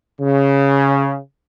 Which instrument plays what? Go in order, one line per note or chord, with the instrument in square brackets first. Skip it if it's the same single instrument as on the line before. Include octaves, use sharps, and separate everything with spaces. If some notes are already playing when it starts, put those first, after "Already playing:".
[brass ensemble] C#3